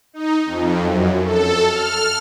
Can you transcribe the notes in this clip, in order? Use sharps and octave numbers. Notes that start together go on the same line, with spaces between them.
D#4
F2
F#2
A4
F6